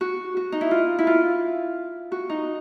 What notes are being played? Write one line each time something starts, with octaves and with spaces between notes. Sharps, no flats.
F#4
F#4
D#4
E4
F4
E4
F4
F#4
D#4